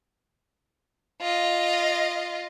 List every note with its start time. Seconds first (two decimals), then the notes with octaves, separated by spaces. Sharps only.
1.22 F4 D#5